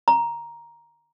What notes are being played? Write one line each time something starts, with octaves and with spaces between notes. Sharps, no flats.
A#5